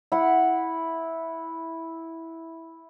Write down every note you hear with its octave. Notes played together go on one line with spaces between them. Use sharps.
E4 F#5